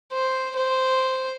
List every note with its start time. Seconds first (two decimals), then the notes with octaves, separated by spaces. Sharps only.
0.12 C5
0.56 C5